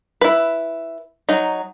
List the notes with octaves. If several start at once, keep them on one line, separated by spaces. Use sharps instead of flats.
E4 B4
F#3 D#4